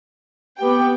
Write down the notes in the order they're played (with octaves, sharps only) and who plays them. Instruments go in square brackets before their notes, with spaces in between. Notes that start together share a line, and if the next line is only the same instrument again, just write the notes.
[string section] B3 G5 [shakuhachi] G4